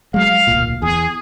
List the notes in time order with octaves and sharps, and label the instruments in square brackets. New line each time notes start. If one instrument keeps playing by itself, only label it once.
[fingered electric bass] F#3 G#3 [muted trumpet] F5
[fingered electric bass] D1 B1 A#2
[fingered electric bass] E2 [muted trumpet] G#4